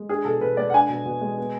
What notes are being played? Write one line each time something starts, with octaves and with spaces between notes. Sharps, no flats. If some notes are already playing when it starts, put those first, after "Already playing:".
Already playing: G#3
D4 G#4
B2 A4
B2 B4
G#3 D5
F#5
D4 G#5
B2
B2
G#3
B3